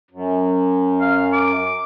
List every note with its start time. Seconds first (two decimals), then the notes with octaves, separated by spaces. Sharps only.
0.11 F#2
1.01 F5
1.33 D6